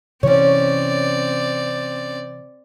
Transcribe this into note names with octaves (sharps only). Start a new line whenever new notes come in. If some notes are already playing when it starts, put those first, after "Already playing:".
C3 E3 C4 C#4 C#5 D5